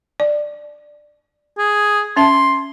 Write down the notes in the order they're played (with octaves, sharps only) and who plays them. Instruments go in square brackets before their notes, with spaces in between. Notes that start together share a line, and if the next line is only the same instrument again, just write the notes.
[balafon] D5
[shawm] G#4
[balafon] C#4 E5 A5 [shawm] C6